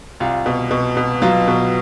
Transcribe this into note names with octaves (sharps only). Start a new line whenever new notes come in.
C2 F4
B2
B2
B2
F#3 F4
B2